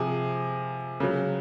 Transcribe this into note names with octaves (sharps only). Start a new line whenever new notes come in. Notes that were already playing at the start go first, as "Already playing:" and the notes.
Already playing: C3 F3 G#4
C#3 F#3